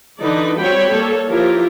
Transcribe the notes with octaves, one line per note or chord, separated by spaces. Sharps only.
D3 E3 D#4 B4 D5
G3 C4 F#4 C#5 G5 B5
A#3 A4 C#5
F3 E4 F4 G4 A#4